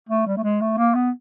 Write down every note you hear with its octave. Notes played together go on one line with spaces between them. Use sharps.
A3
G3
A3
G#3
A3
A#3
B3